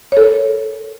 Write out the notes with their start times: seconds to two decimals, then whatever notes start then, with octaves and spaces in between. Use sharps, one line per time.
0.12 C#5
0.17 A4
0.21 A#4